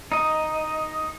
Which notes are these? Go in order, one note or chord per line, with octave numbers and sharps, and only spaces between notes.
D#4 D#5